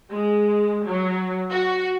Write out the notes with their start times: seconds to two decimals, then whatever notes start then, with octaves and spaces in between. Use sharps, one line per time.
0.10 G#3
0.86 F#3
1.50 F#4